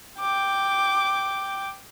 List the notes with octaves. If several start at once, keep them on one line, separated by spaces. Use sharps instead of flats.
G5 D6